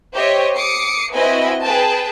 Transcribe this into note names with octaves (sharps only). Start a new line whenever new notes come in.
G4 C5 C#5 D#5 E5
D6 D#6 C7 C#7
C4 E4 F#4 B4 D#5 G#5
G#4 B4 G5 A5